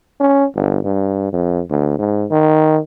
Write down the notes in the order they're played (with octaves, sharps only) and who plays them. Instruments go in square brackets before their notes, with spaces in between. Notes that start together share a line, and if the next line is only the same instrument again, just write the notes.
[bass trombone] C#4
G1
G2
F2
D2
G#2
D#3